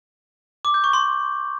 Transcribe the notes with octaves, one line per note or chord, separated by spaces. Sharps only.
D6
G6
C#6
C6